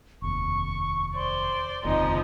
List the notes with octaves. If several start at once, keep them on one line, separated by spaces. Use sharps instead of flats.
F1 D#2 C#6
C5 D5 C6
F1 D#2 C#3 F3 G#3 C4 D#4